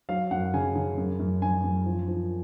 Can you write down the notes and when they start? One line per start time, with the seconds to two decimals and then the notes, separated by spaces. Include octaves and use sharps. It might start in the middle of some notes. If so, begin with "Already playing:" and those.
0.09 F#3 F5
0.31 F#2 F#5
0.54 C#3 G#5
0.75 C#3
0.97 F#2
1.19 F#2
1.42 F#2 G#5
1.64 F#2
1.86 F3
2.08 F3